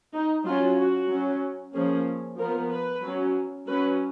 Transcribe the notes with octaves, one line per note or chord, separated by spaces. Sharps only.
D#4
F#3 C#4 F4
F#4
F#3 C#4
F3 A#3 C#4 G#4
F3 B3 A#4
B4
F#3 C#4
F#3 C#4 B4